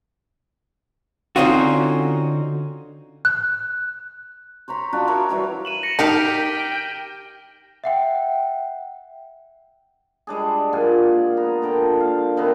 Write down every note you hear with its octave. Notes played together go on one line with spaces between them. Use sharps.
D3 C4 C#4 D#4 F4 F#4
F#6
C5 C#5 A#5 B5
D4 F4 F#4
F#4 A#4 C#5 E5
E3 F#3 G3 B4
D#7 E7 F#7
A#6 C#7
D#3 D#4 G4 A#4 F5 G6
G5 B6
E5 F#5 G5
G3 G#3 D4 G#4
A#2 F4 F#5 G#5
B3 A#5
A#2 D3 G5
F5
C3 D#3 B3 C4